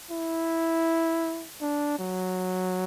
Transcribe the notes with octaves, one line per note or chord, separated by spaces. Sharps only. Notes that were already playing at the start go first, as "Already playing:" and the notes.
E4
D4
F#3